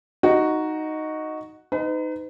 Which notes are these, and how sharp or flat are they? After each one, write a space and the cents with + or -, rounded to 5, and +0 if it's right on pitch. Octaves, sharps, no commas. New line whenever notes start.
D#4 +0 F#4 +0
D#4 +0 B4 +40